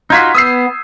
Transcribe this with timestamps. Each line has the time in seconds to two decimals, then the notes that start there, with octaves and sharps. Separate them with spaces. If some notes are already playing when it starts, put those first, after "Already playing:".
0.10 D#4 F4 F#4 G6 G#6 B6
0.34 B3 D#6 E6 C7